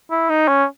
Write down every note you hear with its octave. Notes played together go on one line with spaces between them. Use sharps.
E4
D#4
C#4